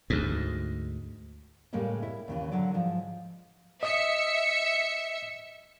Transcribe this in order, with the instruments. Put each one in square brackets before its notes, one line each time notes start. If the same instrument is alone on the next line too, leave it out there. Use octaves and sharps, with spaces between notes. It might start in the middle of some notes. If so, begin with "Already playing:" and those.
[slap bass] D2 G#2
[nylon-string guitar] A2 C#3 G3 G#3 A#3 C#4
E4
D#2 C#3 E3
D3 F#3 D5
G#2 F3
[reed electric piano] D#5 D#6 [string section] E5 C#7